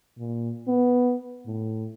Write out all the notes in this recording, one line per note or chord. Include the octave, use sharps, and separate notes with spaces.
A#2
B3
A2